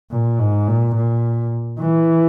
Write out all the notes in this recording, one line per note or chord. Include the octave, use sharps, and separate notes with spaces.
A#2
G#2
A#2
A#2
E3